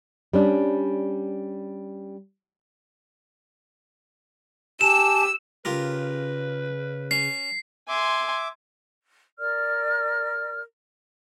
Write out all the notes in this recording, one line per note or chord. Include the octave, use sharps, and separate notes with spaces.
G3 C#4 D4
G4 G#5 A5 E6 E7
C#3 F4 G4 A#4 B4
C#4 C7
E5 G#5 C6 D6
A#4 D5 F6